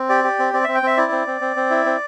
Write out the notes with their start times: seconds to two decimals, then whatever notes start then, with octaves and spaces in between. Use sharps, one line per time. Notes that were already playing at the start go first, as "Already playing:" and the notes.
Already playing: C4
0.09 G4 D5
0.24 G4
0.39 C4
0.53 C4 D5
0.64 C4 E5
0.75 G5
0.83 C4 E5
0.97 E4 D5
1.12 C4
1.27 C4
1.41 C4
1.56 C4
1.71 E4
1.86 C4